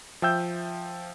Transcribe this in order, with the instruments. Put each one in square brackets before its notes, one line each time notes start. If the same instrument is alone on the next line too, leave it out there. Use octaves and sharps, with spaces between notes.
[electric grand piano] F3 E5 G5 E6 G6